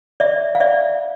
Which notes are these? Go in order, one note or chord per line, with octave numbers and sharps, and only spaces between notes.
D5 E5
F5
D5 E5